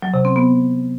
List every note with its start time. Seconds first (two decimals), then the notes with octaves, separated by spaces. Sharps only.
0.02 F#3
0.14 C3
0.25 C4
0.36 B3